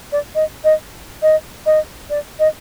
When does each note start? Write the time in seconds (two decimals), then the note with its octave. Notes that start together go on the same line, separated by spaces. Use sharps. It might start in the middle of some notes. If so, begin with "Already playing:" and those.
0.12 D5
0.35 D#5
0.64 D#5
1.22 D#5
1.66 D#5
2.10 D5
2.39 D#5